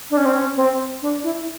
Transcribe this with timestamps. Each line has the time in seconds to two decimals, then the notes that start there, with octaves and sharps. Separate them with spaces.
0.11 D4
0.17 C#4
0.25 C4
0.33 C#4
0.56 C4
1.02 D4
1.23 E4